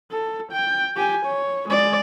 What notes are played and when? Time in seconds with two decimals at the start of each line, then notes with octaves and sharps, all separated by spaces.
0.12 A4
0.52 G5
0.96 G4 G#5
1.26 C#5
1.69 G#3 D5